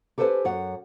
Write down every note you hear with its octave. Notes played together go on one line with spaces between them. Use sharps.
G4 A4 B4 C5 G5 G#5
F#2 C#5 F#5